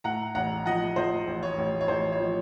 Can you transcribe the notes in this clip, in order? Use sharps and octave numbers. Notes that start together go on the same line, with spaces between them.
A2 F#5 A#5
A1 F#5 A#5
F3 D#5 F#5
F3 C5 D#5
A1
C#5
A1
C#5
A1 C5
C#5
F3